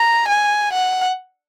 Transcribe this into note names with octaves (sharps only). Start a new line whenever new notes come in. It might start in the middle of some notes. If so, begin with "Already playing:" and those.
Already playing: A#5
G#5
F#5